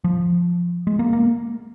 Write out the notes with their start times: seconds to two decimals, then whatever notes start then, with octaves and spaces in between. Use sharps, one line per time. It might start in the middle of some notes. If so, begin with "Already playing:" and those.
0.04 F3
0.87 G#3
0.99 A#3
1.13 A#3